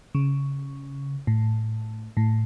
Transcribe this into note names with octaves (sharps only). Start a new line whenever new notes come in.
C#3
A2
A2